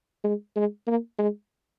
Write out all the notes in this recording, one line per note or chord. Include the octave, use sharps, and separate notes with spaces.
G#3
G#3
A#3
G#3